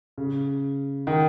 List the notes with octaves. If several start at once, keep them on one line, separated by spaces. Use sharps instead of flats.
C#3
D#3